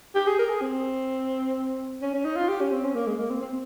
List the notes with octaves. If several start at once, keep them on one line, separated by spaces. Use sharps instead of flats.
G4
G#4
A#4
G#4
C4
C#4
C#4
D#4
F4
G4
C#4
C4
C#4
A#3
G#3
A#3
C4
C4